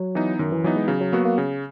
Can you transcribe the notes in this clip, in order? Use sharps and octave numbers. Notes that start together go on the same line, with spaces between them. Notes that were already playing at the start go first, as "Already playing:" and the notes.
Already playing: F#3
E3 B3 D#4
F#2 D#3
E3
E3 F#3 B3 D#4
G#3
C#3 F#3
F#3
F#3 A#3 B3 F#4
A#3
C#3